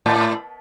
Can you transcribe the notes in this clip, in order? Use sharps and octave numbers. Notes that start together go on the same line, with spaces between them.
A2